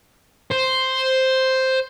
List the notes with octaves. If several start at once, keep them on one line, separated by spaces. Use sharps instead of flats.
C5